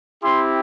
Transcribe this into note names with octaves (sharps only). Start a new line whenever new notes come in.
C4 E4 G4 C6